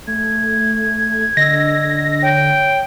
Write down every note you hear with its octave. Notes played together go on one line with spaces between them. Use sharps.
A3 G#6
D3 D#5 E6 A#6
C#5 G5